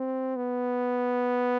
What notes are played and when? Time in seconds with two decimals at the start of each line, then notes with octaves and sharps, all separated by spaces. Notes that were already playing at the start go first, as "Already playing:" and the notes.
Already playing: C4
0.36 B3